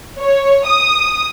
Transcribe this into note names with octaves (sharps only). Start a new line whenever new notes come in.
C#5
D#6